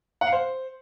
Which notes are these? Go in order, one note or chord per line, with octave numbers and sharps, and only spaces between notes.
F#5
F5
C5